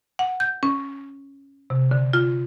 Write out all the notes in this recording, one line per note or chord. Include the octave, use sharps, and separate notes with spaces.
F#5
G6
C#4
C3
D3
F4